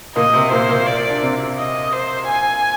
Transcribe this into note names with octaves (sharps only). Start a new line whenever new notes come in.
A#2 A#3 D#5
C3 C4
A#2 A#3 C5
A#2 A#3
D5
D4
C3 C4
D#5
C5
G#5